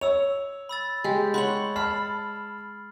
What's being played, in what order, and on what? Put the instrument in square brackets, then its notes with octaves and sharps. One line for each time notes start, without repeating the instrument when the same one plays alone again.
[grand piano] C#5 [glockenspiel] E6 F7
[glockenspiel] B5 E6 A6
[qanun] G#3 G4
[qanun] C#5 F#5 [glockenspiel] B5 C6 F#7
[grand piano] A5 B5 [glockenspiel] F6 C7